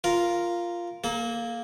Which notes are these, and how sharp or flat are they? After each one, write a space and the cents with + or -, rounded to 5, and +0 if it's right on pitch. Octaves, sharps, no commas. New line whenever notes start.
F4 -5 A#4 +0
A#3 +0 A4 -40